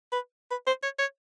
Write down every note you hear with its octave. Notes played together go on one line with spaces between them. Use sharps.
B4
B4
C5
C#5
C#5